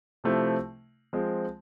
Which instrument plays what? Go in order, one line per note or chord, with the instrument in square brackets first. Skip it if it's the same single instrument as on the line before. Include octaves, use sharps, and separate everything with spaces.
[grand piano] C3 F3 A3 C4 E4
F3 G#3 C4